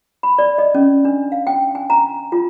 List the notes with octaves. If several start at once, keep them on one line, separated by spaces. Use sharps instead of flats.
B5
D5
D#5
C#4
D4
F5
G5
G#5
A#5
F4